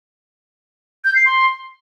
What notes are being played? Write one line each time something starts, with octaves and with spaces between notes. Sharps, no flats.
G6
C7
C6